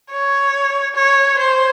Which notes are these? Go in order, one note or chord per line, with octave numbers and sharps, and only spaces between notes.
C#5
C#5
C5